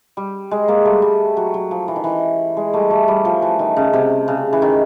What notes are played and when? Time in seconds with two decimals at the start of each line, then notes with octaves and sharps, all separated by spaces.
0.17 G3
0.51 G#3
0.68 G#3 A#3
0.85 G3 A3
1.02 G3
1.37 F#3
1.54 F#3
1.71 F3
1.88 E3
1.96 D#3
2.04 E3
2.57 G#3
2.73 G3 A3
2.91 G3 A3
3.08 G3
3.25 F3
3.42 E3
3.59 D#3
3.77 C#3
3.93 C3
4.28 C#3
4.53 E3
4.62 D#3